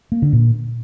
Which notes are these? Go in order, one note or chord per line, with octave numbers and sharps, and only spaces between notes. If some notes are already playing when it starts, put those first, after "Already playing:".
A#3
D3
A#2